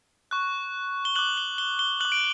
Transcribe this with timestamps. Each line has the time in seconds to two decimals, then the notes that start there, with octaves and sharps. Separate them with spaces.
0.31 C#6 F#6
1.05 G7
1.16 D6 F#6 F#7
1.37 G7
1.58 G7
1.79 G7
2.00 F#6 F#7
2.05 D6
2.12 D7